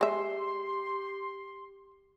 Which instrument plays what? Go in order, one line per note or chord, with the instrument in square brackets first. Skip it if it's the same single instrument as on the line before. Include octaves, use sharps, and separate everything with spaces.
[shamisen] G#3 E5 [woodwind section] G4 C6